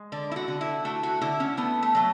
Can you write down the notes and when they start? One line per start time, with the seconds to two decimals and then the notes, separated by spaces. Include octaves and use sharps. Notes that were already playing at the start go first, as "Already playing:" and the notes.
Already playing: G#3
0.12 D3 D5
0.31 E4
0.36 F#4
0.48 D3
0.61 E4
0.85 A3 F#4
1.03 F#4
1.21 D3 E4
1.40 C#4
1.57 A3 B3
1.83 A3
1.95 F#3 A3